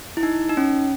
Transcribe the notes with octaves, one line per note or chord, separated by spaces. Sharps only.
E4
D#4
D#4
C#4